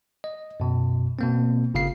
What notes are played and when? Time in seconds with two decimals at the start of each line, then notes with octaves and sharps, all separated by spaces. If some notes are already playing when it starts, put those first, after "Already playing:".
0.24 D#5
0.60 F#2 B2
1.19 B2 A#3 C4
1.74 G1 C#3 F5 C7